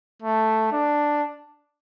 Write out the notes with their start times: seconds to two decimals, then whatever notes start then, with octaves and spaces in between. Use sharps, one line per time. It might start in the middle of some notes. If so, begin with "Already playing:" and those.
0.22 A3
0.72 D4